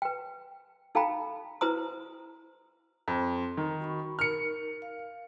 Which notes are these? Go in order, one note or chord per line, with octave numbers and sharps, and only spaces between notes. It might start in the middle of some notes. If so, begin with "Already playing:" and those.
B4 G5
D#4 A4 F5 G5 A#5 B5
E4 B4 C5 A#5 D#6
F2 C6
D#3
F#4 B5 C#6
D#4 A#4 F6 C#7
F5